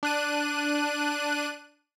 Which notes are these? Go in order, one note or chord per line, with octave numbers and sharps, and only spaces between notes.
D4 F#6 D#7